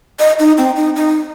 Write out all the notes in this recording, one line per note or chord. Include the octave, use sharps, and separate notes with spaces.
D#5
D#4
C4
D#4
D#4